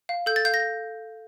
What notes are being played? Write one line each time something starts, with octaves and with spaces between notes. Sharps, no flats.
F5
A4 G6
A6
F5 G6
A#6